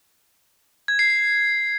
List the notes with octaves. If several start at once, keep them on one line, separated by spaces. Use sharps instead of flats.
G#6
C7
C7